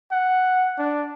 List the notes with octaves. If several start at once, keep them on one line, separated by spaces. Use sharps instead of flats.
F#5
D4